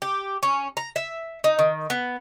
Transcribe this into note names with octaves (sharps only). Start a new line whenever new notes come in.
G4
C#4
A#5
E5
D#4
D#3
B3